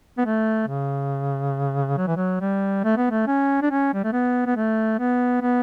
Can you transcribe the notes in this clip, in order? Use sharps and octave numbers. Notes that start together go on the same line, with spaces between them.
B3
A3
C#3
F#3
E3
F#3
G3
A3
B3
A3
C#4
D4
C#4
G3
A3
B3
B3
A3
B3
B3